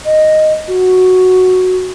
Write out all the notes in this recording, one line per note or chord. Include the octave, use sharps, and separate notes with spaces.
D#5
F#4